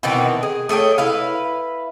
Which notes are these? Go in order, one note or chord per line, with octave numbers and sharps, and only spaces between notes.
B2 D#3 E3 C4
G#4
A3 G#4 C#5 G5
E4 B4 F5